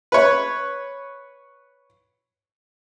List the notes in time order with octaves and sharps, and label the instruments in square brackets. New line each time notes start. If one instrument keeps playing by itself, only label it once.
[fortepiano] B4 C#5